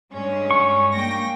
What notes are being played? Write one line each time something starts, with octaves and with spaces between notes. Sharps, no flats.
G2 G#3 C#4
C#6
A#3 G5 A#6